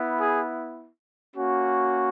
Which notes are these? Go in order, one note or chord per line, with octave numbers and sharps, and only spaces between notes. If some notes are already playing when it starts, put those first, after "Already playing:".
Already playing: B3 E4
G#4
A#3 C#4 F#4